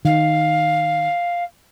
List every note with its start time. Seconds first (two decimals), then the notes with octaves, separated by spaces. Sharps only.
0.05 D#3 F5